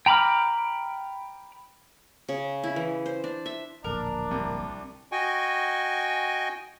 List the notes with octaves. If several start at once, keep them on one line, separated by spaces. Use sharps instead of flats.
G5 A#5 B5 D6 F6
C#3
E4
E3
C5
D4
E5
D1 A#1 D4 A#4
C2
F#4 D#5 G5 G#5 C#6